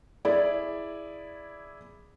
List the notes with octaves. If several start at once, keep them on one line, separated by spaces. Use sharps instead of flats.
E4 G#4 D5